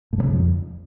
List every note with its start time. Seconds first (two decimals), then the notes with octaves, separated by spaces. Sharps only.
0.13 A2
0.18 G2
0.23 C#3
0.28 E2
0.34 F2